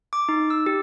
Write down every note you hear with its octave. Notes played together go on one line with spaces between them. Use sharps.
D6
D#4
E6
G4